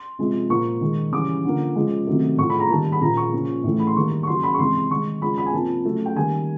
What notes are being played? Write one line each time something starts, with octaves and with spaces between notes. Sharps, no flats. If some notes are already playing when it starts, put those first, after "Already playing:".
Already playing: C6
C3 F3 G#3
A#2 F3 A#3 C#6
D#3 G#3
C#3 E3 G3 D6
D3 F3 A#3
C#3 F3 G#3
C3 D#3 F#3 A3
A2 F3 A3 C#6
B5
A#5
D#3 G3 A#3 A5
B5
A#2 F3 A#3 A#5
C#6
C#3 F3 A#3
A2 E3 A3
B5
C6
D#3 G3 A#3 C#6
C#6
C#3 F#3 A#3 C6
B5
C#6
C3 E3 G#3 C6
D#3 G#3 C#6
C#3 F3 G#3 B5
B5
G#5
C3 F3 A#3 A5
C#3 F#3 A3
G5
D#3 G3 A#3 G#5